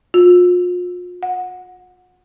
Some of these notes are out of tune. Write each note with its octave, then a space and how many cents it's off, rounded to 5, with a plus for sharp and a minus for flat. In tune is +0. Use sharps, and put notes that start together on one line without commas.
F4 +40
F#5 -20